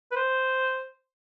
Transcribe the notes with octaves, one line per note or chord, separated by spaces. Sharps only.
B4
C5